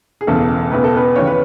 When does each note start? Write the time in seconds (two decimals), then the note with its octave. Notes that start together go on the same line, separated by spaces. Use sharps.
0.21 G#4
0.27 E1 E2 C#3 A4
0.72 E1 E2 C#3 B4
0.84 A4
0.96 B3 B4
1.16 D#2 C#3 E3 C#5
1.27 B4